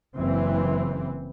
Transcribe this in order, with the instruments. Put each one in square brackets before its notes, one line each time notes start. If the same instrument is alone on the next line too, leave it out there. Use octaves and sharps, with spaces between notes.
[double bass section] F#1 E3 C4